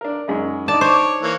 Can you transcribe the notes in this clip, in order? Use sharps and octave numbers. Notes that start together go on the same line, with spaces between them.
D4 A#4
F#2 G#3 D#4
D4 D#4 D5 A5
C5 C#5 D6
E3 A#3 C#5